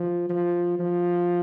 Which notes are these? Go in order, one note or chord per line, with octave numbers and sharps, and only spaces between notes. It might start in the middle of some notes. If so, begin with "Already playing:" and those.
Already playing: F3
F3
F3